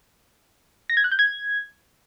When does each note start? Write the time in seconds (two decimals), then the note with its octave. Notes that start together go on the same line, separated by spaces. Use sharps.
0.90 A#6
0.97 G#6
1.04 F#6
1.12 G6
1.19 G#6